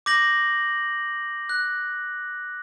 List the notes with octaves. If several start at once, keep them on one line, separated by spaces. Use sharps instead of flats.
D6 G6 A#6 F#7
F#6